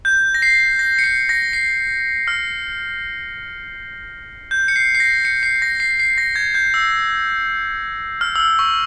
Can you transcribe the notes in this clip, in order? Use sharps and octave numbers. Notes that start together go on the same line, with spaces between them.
G6
A#6
C7
A#6
C#7
C7
A#6
C7
F6
G6
C#7
C7
C7
A#6
C#7
C7
A#6
C7
C7
A#6
G#6
G6
E6
F6
E6
F6
C#6